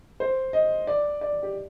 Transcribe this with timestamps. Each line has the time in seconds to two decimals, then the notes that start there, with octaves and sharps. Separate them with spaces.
0.20 C5
0.53 D#5
0.87 D5
1.21 D5
1.43 G4